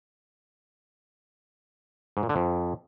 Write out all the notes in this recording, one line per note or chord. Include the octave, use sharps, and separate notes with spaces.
G#2
A#2
D3
F2